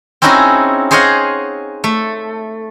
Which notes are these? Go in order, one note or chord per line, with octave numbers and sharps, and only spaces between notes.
C4 C#4 D#4 E4 F#4 G#4
G#4 C5 C#5 D#5 F5 F#5
A3